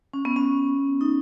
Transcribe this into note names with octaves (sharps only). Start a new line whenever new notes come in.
C#4
B3
C#4
D#4